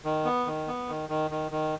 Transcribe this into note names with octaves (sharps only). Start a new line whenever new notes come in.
D#3
B3
D#3
B3
D#3
D#3
D#3
D#3